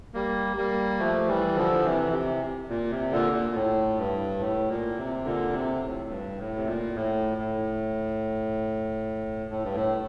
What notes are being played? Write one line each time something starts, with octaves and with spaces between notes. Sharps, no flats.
G3 A#3
G3 A#3
F3 A3
E3 G3
D3 F3
C3 E3
C3
A#2
C3
A#2 D3
A#2
A2
G2
A2
A#2
C3
A#2 D3
C3
A2
G2
A2
C3
A#2
A2
A2
A2
G2
A2